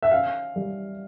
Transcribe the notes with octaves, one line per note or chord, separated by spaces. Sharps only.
E5
C#4 F5
G3